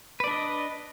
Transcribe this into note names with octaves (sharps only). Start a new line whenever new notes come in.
D4 B4 D5 D#5